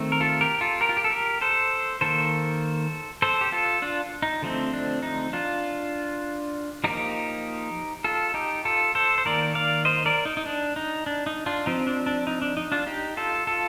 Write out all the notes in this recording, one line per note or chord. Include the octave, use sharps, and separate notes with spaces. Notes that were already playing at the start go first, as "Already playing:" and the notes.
Already playing: D#3 A3 C4
A#4
F4 A4
G4 A#4
F4 A4
G4 A#4
F4
G4
A4
G4 A#4
A4 C5
D#3 A#3 A4 C5
A4 C5
G4
F4 A4
D4 F4
D#4
D3 F3 A3 C4
D4
D#4
D4 F4
F3 A#3 D#4 G4
F4 A4
D#4 G4
F4 A4
A4 C5
C5
D#3 A#3 A#4 D5
D5 F5
C5 D#5
A#4 D5
D#4
D#4
D4
D#4
D4
D#4
D4 F4
F3 C4 D#4
D4
D4
D#4
D4
D#4
D4 F4
D#4 G4
F4 A4
F4 A4